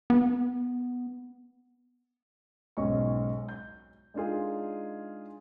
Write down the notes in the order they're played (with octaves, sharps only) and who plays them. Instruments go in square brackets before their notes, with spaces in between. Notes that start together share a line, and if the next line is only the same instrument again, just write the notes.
[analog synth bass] B3
[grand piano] B1 G#2 G#3 C#4 C#6
G6
G#3 D4 D#4 F4 G#4